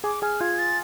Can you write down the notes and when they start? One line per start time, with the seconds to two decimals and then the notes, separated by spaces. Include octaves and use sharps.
0.04 G#4 G#5 D6
0.22 G#4 G#5 F6
0.41 F4 F5 G#6
0.59 A6